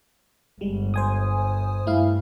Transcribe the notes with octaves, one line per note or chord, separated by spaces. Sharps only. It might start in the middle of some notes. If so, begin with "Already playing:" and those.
G1 G3 G#3
C5 G#5 D#6
G2 A3 E4 F5